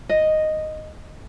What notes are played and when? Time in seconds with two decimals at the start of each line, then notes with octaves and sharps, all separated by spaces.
0.09 D#5